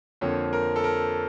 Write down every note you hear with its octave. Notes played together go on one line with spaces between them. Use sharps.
F2 D3 F3 A#3 C#5
A#4
A4
A#4